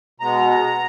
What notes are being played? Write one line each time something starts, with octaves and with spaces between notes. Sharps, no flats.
B2 G#3 B3 A#5